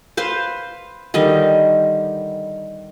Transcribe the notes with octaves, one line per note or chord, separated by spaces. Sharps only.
B4 C5 F5
D3 D#3 G3 D#5